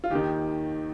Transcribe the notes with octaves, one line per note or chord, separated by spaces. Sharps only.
F4
D#2 D#3 G4